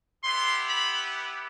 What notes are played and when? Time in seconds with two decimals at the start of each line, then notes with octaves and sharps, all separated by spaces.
0.24 B3 E4 G4 C6
0.69 B5